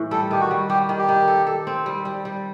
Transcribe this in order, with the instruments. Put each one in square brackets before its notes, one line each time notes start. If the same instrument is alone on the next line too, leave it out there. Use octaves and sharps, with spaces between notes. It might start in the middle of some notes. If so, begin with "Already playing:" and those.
Already playing: [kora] A2 E3
[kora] G3 [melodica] A4
[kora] D#3 [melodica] G4
[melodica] F#4
[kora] G3
[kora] G3 [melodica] G4
[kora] D#3
[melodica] G4
[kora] D#3
A4
A4
C4
G3
G3
G3